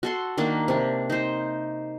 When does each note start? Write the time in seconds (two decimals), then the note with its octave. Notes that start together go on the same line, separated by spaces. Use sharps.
0.03 F#4 A4 C6
0.37 D#3 A#3 D4
0.68 C3 D4
1.10 D#4 C5